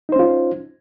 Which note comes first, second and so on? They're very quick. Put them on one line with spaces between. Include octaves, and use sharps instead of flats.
D#4 C5 C#4 F4